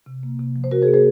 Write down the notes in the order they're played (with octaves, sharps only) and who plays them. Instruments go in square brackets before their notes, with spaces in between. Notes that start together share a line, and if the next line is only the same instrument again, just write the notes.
[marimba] C3
A#3
C3
F3
C5
C3 F#4 A#4
G#4 C5
A#3
G#4 C5